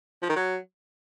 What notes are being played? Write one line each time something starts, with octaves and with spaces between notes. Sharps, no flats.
F3
D#3
F#3